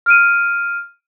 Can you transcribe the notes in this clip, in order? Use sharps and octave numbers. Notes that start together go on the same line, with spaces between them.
F6 D7 D#7